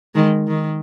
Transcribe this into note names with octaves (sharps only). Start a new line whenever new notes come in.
D#3 G#3
D#3